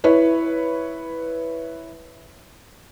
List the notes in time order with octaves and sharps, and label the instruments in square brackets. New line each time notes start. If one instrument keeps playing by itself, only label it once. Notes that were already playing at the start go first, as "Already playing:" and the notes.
[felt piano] E4 B4 C#5